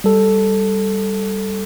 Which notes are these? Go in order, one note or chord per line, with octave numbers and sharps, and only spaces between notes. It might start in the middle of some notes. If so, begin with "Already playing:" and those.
G3 A4